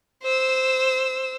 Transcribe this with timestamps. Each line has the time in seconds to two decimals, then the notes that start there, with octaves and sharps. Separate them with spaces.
0.23 C5 E6